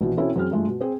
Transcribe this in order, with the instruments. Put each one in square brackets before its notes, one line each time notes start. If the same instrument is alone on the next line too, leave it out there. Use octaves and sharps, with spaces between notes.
[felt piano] A#1 B2 E3
B2 C4 C#4 E4 F#4 A4
F#2 C4 G#4 F6
G2 G#3 A3 F4
B2
C4 G#4